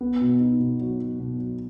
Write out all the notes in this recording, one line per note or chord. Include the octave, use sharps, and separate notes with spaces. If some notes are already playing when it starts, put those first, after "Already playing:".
B3
B2
D#4
B2
F#3
F#3
B2
F#3